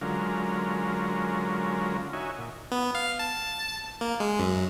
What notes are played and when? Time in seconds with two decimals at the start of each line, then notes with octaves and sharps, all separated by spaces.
0.02 D3 F#3 G#3 C#4 F4 A#4
2.13 D#4 F#4 C#5 E5 G#5
2.38 A#2
2.72 B3
2.95 F5
3.19 A5
4.01 A#3
4.20 G#3
4.40 F#2